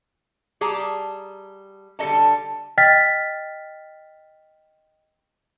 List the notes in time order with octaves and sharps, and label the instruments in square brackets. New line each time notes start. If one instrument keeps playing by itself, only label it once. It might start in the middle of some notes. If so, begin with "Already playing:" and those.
[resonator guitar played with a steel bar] G3 G#4 A5 A#5
D3 G3 A4 D#5 A5
[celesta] D#5 G5 F6 A6 B6